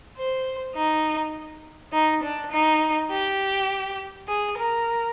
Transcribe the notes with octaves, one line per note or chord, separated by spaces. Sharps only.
C5
D#4
D#4
D4
D#4
G4
G#4
A#4